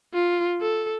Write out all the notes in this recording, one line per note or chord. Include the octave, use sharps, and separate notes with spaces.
F4
A4